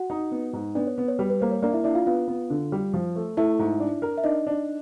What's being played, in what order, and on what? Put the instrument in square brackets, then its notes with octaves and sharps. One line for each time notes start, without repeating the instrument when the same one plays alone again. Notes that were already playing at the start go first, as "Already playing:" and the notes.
Already playing: [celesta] F#4 F#5
[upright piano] D#4
B3
G#2
[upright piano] B3 [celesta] D4 D5
[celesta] C#5
[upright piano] B3
[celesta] C#5
[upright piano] G3 [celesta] B4
[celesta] B4
[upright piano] A#3 [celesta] C5
[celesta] C#5
[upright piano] A#3 [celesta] D4 D5
[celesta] F5
E4 E5
[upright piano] D4 [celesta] E4 E5
[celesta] F4 F5
[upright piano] B3 [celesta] F4 F5
[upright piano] B3
D3
G3
F3
A3
[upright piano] A3 [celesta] E4 E5
[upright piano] G#2
D4
A#4
[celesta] E5
[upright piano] D4 [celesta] D#4 D#5
[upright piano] D4